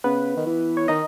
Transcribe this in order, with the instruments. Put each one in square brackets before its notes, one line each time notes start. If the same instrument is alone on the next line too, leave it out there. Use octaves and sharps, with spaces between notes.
[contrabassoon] C#3 [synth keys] B3 B4
[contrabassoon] D#3
E3
[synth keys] C#5
[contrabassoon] D#3 [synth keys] D#4 D#5